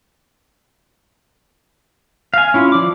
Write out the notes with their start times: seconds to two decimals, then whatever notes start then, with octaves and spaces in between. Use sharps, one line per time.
2.34 F5 G#5
2.54 C#4 E4 F4
2.72 F3 D5 D6